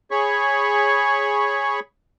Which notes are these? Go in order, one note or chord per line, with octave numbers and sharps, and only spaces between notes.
G#4 C#5 B5 C#6